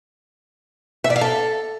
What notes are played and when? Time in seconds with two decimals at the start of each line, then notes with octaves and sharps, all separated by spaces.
1.04 E5
1.10 D5
1.16 F5
1.21 A4